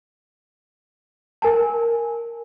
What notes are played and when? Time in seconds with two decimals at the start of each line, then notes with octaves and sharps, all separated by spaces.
1.42 A#4 G#5 A5